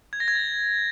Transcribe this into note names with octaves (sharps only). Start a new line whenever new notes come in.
G#6
A#6
G#6
A6